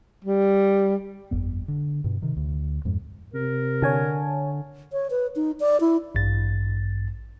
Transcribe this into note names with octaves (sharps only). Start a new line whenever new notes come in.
G3
G1 F2 B3
D3
G2 B2
C3 D#3
D2
F2 G#2
C3 A#4
D3 C#5 G#5 A5
C#5
B4
D#4
D5
E4
A1 G2 A6